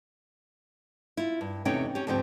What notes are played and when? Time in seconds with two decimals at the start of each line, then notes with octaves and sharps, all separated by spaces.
1.17 E4 F4
1.41 G2
1.65 E2 C3 A3 C#4 D#4 G5
1.95 C#4 G4
2.07 D2 G#2 F3 C4 G4 G5